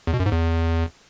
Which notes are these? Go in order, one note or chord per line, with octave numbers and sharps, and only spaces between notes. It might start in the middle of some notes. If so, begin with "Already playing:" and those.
E2
B2
F#2
G#2
E2